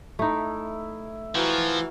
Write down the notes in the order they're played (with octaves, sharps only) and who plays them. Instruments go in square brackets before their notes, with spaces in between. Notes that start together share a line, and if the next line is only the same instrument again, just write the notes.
[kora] A3 D#4 [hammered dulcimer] E4
[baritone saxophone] E3 [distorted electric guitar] F3 [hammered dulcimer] F#4 A#4